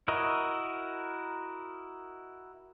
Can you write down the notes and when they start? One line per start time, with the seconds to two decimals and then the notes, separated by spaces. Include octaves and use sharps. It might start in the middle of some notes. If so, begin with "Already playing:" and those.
0.08 E4 F#4 A#4 D#5